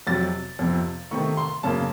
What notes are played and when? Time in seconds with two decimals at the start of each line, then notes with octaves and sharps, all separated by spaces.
0.07 F2 C3 F#3 A6
0.59 F2 C3 F3
1.11 C3 D#3 A3 C#6
1.37 C6
1.63 F#2 C#3 F#3 A#3 A5